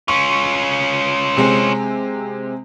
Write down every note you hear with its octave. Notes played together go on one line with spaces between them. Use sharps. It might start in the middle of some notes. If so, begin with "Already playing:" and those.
C#4 F4 C#6
C3 G#3 C4